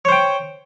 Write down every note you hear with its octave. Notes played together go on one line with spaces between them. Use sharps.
C5 C#5 G5